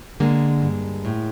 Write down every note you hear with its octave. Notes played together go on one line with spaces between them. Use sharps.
D3 G#3 A#3
G2
A2